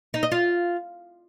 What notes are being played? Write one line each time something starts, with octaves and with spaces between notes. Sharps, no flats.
D#4
D#5
F4